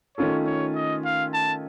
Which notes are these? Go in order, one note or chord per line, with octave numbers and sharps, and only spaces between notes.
D#3 A3 C#4 F4 A4 C#5
C#5
D#5
F5
A5